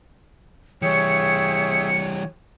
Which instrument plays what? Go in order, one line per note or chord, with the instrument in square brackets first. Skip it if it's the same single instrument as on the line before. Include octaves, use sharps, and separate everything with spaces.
[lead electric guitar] E3 G3 [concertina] G#4 E5 G5 [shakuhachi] C#5 [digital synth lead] C#7